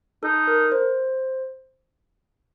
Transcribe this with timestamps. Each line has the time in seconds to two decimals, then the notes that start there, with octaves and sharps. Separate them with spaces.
0.23 D#4 A4
0.47 A#4
0.72 C5